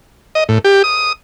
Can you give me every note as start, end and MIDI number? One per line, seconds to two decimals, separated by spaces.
0.35 0.44 75
0.49 0.58 45
0.64 0.82 67
0.84 1.13 87